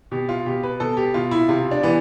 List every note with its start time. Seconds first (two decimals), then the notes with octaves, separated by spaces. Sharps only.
0.11 B2 G4
0.29 F4
0.46 B2 G4
0.63 B4
0.80 B2 A4
0.97 G4
1.14 B2 F4
1.31 E4
1.48 C3 F4
1.71 D4
1.83 E3 B3